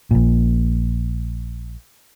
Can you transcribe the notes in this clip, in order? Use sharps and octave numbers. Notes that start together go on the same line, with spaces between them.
A#1 A#2